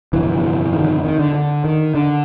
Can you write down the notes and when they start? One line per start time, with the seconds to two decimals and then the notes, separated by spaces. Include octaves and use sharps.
0.13 G1 F2 C3 E3
0.73 D#3
1.04 D#3
1.19 D3
1.34 D3
1.65 D#3
1.95 D3